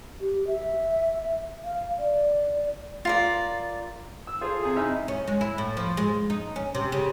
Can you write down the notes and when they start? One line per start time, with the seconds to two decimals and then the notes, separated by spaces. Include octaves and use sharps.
0.21 G4
0.48 E5
1.64 F5
1.99 D5
3.05 F4 A#4 D5
4.27 E6
4.41 F4 G#4 A4 C5 G#5
4.63 C3 G#4
4.76 C3 D#4 E4 E5 F6
5.08 C#4
5.28 G#3
5.41 E4
5.58 A2
5.77 F3
5.97 G#3
6.30 D#4
6.56 C#4
6.75 C3
6.92 C#3